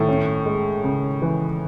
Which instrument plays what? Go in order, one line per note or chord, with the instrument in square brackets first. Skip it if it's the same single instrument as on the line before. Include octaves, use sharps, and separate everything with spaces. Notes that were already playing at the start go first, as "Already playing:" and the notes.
Already playing: [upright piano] A2 A3 [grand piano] D#3
[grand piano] C#4
G#3
C#3
E3